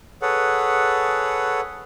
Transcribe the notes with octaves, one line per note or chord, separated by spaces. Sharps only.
G#4 A4 B4 C#5 F#5